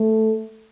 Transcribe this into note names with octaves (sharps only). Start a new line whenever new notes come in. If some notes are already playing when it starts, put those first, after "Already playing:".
Already playing: A3